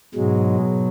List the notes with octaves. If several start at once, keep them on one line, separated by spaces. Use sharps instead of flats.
G#2 B2 F#3 G#3